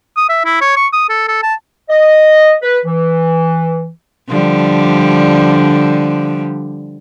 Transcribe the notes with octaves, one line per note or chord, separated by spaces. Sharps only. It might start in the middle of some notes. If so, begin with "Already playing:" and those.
D#6
E5
E4
C#5
C#6
D#6
A4
A4
A5
D#5
B4
E3
D3 F3 G3